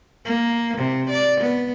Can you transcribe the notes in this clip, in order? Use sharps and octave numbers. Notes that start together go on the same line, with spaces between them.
A#3
C3
D5
B3